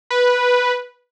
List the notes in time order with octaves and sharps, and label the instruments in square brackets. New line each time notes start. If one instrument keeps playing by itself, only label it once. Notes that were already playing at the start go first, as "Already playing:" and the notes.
[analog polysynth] B4